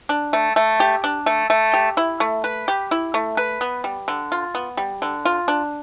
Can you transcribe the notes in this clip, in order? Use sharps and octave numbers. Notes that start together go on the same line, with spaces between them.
D4
A3
A3
G4
D4
A3
A3
G4
E4
A3
B4
G4
E4
A3
B4
B3
G3
D3
F4
B3
G3
D3
F4
D4